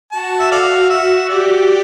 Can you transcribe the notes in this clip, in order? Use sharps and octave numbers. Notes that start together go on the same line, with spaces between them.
F#4 A5
E5
A4 D5 F5
E5
G4 D5